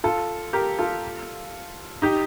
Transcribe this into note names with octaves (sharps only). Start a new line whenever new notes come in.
F4 A4
G4 A#4
F4 A4
D#4 G4